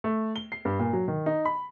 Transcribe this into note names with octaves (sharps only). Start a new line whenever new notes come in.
A3
G7
C7
G2
A#2
F#3
D#3
D#4
B5